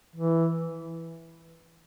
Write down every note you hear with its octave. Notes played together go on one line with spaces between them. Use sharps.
E3